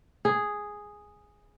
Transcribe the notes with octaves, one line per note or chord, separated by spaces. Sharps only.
G#4